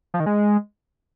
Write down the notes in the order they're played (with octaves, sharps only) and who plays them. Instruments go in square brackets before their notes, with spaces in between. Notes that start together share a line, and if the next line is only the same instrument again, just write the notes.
[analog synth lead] F3
D#3
G#3